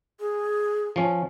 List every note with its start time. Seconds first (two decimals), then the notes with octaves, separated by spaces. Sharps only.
0.20 G#4
0.96 F3 C#4